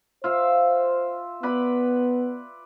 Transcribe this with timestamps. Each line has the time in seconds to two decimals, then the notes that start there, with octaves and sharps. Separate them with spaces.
0.24 F4 C5 E5 F5
1.43 B3 B4 D5 B5